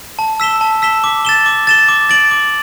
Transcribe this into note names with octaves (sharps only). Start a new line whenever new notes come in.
A5
E6 B6 E7 G7
A5
E6 B6 E7 G7
D6
A6 E7 G7
D6
A6 E7 G7
D6
A6 D7 F#7
D6